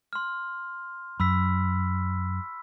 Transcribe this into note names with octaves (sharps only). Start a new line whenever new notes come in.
C6 F6
F#2 B5 E6 B6